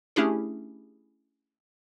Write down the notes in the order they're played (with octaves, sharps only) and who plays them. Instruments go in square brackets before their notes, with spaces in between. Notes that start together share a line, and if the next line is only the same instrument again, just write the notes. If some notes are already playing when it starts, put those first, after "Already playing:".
[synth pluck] A3 C#4 D4 E4 G4 G#4